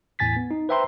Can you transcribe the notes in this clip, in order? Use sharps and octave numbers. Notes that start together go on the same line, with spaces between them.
E2 A2 G#5 A6 B6
B3
D#4
B4 C5 E5 G5 A#5 C6